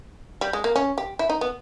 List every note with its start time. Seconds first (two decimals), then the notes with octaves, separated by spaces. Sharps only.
0.41 G3
0.53 G#3
0.64 A#3
0.76 C#4
0.98 G4
1.19 E4
1.30 D#4
1.41 B3